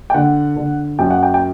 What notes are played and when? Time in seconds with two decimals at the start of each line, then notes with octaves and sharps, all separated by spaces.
0.10 G5
0.14 D3 F#5
0.57 D3
0.99 F#2 G5
1.11 F#5
1.23 G5
1.34 G5